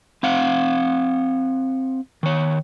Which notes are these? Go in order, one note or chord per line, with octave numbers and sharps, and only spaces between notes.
C4 F5 F#5
D#3 C#5